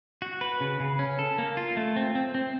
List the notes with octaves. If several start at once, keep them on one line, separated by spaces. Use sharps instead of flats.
F#4
B4
C#3
C#3
C#4
A4
A#3
F4
A3
C4
C4
C4